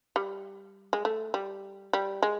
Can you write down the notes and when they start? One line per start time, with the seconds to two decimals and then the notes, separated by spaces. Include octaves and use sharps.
0.16 G3
0.93 G#3
1.05 A3
1.34 G3
1.93 G3
2.22 G#3